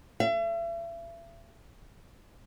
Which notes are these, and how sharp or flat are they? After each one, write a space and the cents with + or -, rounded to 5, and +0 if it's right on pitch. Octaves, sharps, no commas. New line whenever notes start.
E5 +40